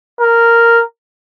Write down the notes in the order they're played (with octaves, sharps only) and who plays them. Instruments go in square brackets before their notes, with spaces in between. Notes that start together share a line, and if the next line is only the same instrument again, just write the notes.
[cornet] A#4